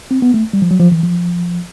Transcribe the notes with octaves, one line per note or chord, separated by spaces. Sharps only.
C4
B3
A3
G3
F3
F#3
F3
E3
F3